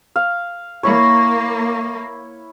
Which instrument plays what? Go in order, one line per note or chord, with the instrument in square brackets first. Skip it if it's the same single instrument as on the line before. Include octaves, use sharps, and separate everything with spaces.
[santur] F5
[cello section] A#3 [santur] E4 C#5